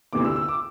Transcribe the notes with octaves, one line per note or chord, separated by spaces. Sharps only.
D2 C3 E3 D6
E6
E6
D6